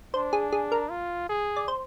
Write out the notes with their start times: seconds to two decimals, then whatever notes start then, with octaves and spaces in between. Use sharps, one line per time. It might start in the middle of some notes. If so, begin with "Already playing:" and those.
0.13 D4 C5
0.33 G#4
0.53 G#4
0.72 A#4
0.90 F4
1.29 G#4
1.56 D5
1.68 C5